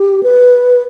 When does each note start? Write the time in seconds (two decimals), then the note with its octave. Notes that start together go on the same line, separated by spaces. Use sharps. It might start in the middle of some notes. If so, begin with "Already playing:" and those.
Already playing: G4
0.23 B4